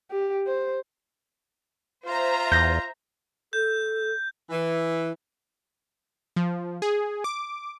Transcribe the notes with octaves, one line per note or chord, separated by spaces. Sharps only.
G4
C5
F4 C5 E5 A#5
E2 G6 A#6
A4 G6
E3
F3
G#4
D6